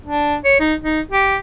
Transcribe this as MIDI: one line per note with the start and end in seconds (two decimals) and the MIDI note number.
0.06 0.36 62
0.44 0.59 73
0.60 0.74 63
0.82 1.01 63
1.11 1.36 67